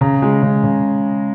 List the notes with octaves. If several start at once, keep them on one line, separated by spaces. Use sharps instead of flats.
C#3 A#5
G#3
C#3
C#3